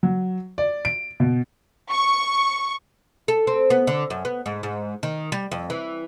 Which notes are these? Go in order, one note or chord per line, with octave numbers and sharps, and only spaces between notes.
F#3
D5
D7
B2
C#6
A4
C4
B3
D3
F#2
B3
G#2
G#2
D#3
G3
F2
E3